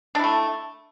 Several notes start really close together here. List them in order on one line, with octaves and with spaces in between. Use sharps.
D4 E4 A3